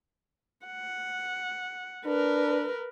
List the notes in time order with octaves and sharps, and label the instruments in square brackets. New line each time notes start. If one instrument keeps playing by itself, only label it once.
[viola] F#5
[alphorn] D4 [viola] A#4 B4